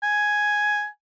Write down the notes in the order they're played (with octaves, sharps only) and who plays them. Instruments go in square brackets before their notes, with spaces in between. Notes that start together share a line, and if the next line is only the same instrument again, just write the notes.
[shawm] G#5